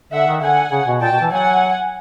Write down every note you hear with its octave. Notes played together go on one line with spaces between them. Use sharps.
D3 E5 F#5
D#3
D3 F#5 G#5
C#3
B2
A#2 G5 A5
B2
E3
F#3 F#5 G#5